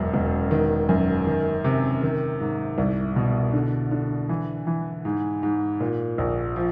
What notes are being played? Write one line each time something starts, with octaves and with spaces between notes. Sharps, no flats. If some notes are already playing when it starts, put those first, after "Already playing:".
Already playing: E1 F#2
E1
D#3
F#2
D#3
C3
D#3
G#2
C2
B2
D3
D3
E3
E3
G#2
G#2
A#2
A#1
F3